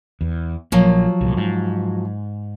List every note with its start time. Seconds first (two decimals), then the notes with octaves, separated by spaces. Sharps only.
0.21 E2
0.72 A#1 F3 F#3 A#3
1.21 C2 A#2
1.37 G#2